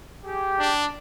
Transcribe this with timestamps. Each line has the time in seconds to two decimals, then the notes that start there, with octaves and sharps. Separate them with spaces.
0.24 G4 G#4
0.59 D4